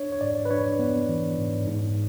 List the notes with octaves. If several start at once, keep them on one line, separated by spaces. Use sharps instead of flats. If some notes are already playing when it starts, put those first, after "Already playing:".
Already playing: D4 C#5
C#5
G#2 D5
B4
D4 C#5
B3
E3
G#2
G#2